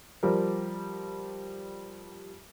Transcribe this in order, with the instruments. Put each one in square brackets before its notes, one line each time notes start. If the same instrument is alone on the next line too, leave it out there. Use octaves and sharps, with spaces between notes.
[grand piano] F3 G3 A#4